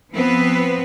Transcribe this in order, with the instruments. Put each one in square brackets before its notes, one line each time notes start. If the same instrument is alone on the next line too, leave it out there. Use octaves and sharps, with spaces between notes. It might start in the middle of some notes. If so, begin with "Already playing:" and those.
[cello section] F3 B3 C4 B4